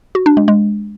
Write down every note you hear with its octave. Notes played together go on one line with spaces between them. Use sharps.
F#4
D4
G#3
G#3